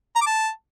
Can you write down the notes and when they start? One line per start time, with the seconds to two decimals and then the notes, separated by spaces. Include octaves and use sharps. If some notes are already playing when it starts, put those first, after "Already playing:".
0.16 A#5
0.21 D6
0.26 A5